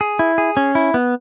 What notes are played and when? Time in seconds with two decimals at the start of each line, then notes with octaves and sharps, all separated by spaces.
0.01 G#4
0.19 E4
0.38 G#4
0.57 C#4
0.75 E4
0.94 B3